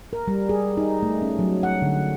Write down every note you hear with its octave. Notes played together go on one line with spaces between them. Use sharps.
A#4
G3
G#4
D#4
A3
C#4
F#3
F#5
D3